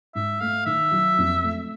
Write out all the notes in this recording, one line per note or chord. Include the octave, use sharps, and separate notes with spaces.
G#2 E5
A3 F5
D#3 E5
F#3
F2
A3